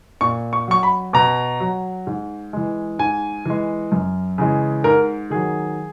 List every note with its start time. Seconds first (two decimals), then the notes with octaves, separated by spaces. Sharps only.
0.21 A#2 C#6
0.53 C#6
0.68 F#3 C#6
0.83 B5
1.13 B2 A#5
1.60 F#3
2.07 G#2
2.53 E3 G#3
2.99 G#2 G#5
3.46 E3 G#3
3.92 F#2
4.38 C#3 E3 G#3
4.84 G#2 A#4
5.30 D#3 F#3 G#4